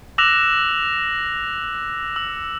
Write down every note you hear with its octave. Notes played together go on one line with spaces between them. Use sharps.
D6 E6 F#6 A#6 E7 F7
E6